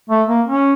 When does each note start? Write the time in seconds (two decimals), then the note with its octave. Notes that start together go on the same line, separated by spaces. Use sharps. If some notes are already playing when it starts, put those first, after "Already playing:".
0.10 A3
0.29 A#3
0.47 C#4